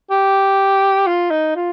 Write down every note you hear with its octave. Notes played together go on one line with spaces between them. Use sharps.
G4
F4
D#4
F4